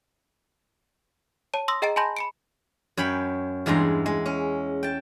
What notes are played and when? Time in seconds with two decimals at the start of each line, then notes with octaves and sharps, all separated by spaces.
1.54 C#5 A5 D#7
1.68 C6 D#6 E6 A#6
1.82 G#4 D#5 G5 A#5 A6 D7
1.96 G#5 A5 B5 C6 G6 A#6
2.17 B5 C#7 D7
2.97 F#2 C#5 G5 B5
3.66 E2 G2 G#3 A#5 C6
4.06 G#3
4.26 C#4
4.83 G5 A5